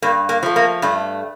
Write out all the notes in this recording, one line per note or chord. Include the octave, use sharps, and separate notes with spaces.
G2 A#3
A#3
F3 A3
A#3
G2 A3